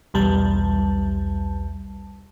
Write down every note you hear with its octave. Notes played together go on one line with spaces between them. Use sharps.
B1 E2 G3 A5